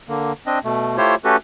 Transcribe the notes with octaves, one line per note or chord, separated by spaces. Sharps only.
D3 A#3
C4 D4 D#5
B2 A3
A3 E4 F4 G4 C5 C#5
A3 C#4 F#4 G4 A4 B4